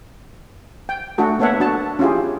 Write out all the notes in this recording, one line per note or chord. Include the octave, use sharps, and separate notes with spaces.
G5
A3 D4 F#4 A4
A#3 B3 A4 C#5 E5 F#5
D4 F#4 A5
C#4 E4 F4 G4 G#4